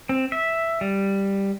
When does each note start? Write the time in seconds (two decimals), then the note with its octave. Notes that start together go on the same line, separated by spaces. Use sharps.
0.09 C4
0.32 E5
0.81 G3